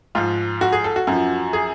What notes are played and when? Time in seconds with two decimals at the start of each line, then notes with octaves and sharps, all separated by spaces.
0.15 G#2 F3 F4
0.61 F#4
0.72 G#4
0.84 A4
0.96 F#4
1.07 F#2 F3
1.53 G#4